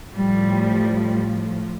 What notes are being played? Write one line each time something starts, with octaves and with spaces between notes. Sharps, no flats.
A2 F3 G3